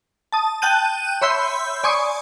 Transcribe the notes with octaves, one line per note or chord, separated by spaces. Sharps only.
A5 D#6
G5 A5 F#6 G6 D#7
C#5 E5 B5 C6 E6 G6
D5 G#5 C6 C#6 D#6